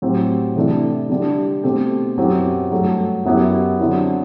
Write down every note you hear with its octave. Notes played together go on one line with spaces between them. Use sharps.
A2 F#3 C4 G4
C3 E3 A3 D4 G4
D3 G3 D4 G4
B2 A3 C4 G4
F#2 F#3 C4 E4 G4
G2 F#3 A3
F#2 F#3 B3 E4 G4
D3 F#3 C4 E4